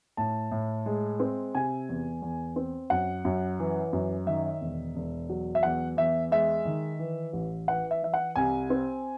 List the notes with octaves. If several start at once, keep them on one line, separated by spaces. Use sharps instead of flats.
A2 A5
A2
G#3
C4
C3 G#5
E2
E2
C4
F#2 F#5
F#2
E3
F#2
D#3 E5
E1
E1
F#3
E5
E2 F#5
E2 E5
G#3 E5
D#3
E3
A1
E3 F#5
E5
E3 E5
F#5
C2 G#5
C4